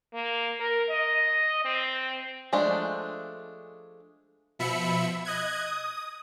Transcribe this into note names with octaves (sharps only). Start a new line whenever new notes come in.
A#3
A#4
D#5
C4
F3 G#3 A3 D4
B2 F3 E5 B5 C#7
D#5 F#6 G#6
D#6